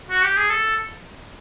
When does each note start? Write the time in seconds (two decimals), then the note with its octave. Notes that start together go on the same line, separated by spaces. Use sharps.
0.10 F#4
0.24 G4
0.37 G#4
0.50 A4